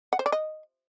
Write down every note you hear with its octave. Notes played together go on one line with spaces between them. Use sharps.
F#5
C5
D5
D#5